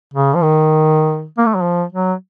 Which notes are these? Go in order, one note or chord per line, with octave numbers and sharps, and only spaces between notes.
C#3
F3
D#3
A#3
A3
F#3
F3
F#3